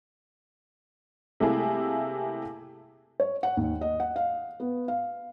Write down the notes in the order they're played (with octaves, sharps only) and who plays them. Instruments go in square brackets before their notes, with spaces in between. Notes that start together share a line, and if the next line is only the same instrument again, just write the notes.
[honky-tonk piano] C3 G3 A3 A#3 E4 G#4
[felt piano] C#5
F#5
D#2
D#5
F#5
F5
B3
F5